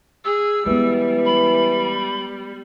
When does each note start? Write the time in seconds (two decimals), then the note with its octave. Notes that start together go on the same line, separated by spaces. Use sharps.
0.25 G#4 E6
0.66 E3 G3 G#3 B3
1.25 B5